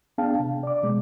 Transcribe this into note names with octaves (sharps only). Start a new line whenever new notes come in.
B3 D4 G#4 F5 G5 A5
C3
D5 D6
B2 G#3